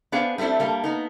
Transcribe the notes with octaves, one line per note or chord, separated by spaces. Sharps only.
B3 D4 G#4 C5 F5
G3 A3 C4 D4 E4
G3 A#3 A4
A#3 B3 D#4